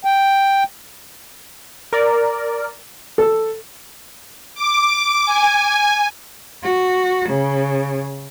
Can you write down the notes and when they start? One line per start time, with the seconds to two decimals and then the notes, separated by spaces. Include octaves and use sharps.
0.05 G5
1.93 A#4 D5
3.18 A4
4.55 D6
5.25 G#5
6.63 F#4
7.29 C#3